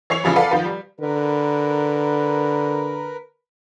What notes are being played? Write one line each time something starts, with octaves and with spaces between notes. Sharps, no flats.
E3 C#5 C7 F7
C#3 E3 F3 G3
A4 B4 D5 F5 F#5
D#3 F3 F4 B4
G3
D3 A#4 B4